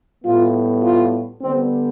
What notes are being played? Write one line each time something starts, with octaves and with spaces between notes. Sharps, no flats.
A2 G3 B3 F4
F4
D3 G3 B3 C4